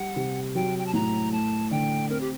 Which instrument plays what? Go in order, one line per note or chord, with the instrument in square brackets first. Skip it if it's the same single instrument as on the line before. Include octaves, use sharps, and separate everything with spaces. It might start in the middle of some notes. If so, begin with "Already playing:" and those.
Already playing: [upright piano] G3 [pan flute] F#5
[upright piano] C3
[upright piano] F#3 [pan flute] G5
[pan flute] G5
A5
[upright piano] A2 [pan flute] A#5
[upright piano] A3 [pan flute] A5
[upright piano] D3 [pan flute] G5
[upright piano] C4 [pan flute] A#4
[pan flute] G4